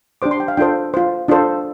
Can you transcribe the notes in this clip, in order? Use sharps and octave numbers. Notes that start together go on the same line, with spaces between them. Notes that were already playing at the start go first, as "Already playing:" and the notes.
D4 G4 C5 D6
C6
G5
F5
D4 F4 A4 C5 G5
F4 C5
D4 F4 A4 C5